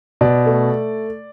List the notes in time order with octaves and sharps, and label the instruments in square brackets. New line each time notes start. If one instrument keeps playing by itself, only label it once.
[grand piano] B2 D5
A3